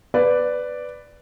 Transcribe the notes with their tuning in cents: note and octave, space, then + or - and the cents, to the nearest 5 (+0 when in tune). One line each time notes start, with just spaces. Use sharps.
B4 +10 D5 +0